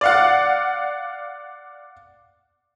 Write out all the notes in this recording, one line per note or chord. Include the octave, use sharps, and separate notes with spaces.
D5 F5 F#5